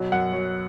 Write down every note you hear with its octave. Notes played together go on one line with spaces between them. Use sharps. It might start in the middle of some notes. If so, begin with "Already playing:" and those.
Already playing: B2 F#3
F#2 F#5
F#3